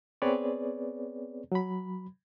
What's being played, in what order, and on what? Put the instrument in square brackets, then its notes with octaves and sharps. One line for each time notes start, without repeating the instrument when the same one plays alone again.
[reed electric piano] B3 C4 G#4 B4 C#5 D5
F#3 B5